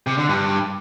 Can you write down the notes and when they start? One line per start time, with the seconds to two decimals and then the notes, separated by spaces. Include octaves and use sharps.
0.07 C3
0.18 D3
0.29 G2